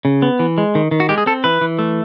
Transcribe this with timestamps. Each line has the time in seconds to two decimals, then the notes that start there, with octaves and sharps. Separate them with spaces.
0.05 C#3
0.22 B3
0.39 E3
0.58 G#3
0.75 D#3
0.91 D#3
1.00 F#4
1.09 G#3 G4
1.18 G#4
1.26 C4 A4
1.44 E3 B4
1.61 E3
1.79 A3